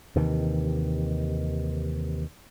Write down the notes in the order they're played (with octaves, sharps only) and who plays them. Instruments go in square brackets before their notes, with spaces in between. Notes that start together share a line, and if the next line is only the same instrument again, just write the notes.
[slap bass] D#2 C3 D#3 E3